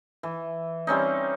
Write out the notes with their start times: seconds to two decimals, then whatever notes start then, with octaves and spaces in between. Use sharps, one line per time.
0.23 E3
0.87 G3 C4 C#4 D#4